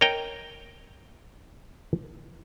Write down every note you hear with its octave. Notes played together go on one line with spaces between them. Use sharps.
A#4 C#5 D#5 G5 A#5